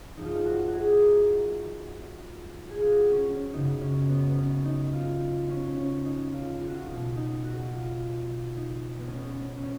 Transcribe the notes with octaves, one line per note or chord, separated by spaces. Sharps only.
F#2 F3 G#3 D#4
F4
D#4
F#4
F#4
G#4
A#4
G#4
F4
F#4
C#4
C#4
F#2 C#3 F#3 B3 D#4
C#4
B3
B3
C#4
D#4
F4
C#4
C#4
D#4
F4
F4
F#4
F4
B2 F#3 B3 D#4
D#4
F#4
F4
D#4
B3
C#4
B3
C#4
C#4